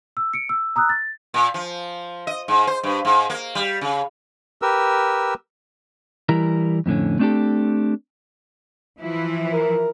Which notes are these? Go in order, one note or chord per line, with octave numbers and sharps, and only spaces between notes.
E6
C#7 D7
E6
A#5 D#6 E6 F#6
A6
A#2
F3
D#5
G#2
C5
G2
G#2
A#3
G3
C#3
G4 A#4 B4 E6
E3 G3 E4 A#4 A#5
F2 A2 D3 C#4
A3 C4 D4 F#4 G4 A4
E3 F3 E4
A#4